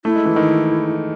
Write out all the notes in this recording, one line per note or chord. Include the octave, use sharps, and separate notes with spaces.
A3 E4
G#3
E3
D#3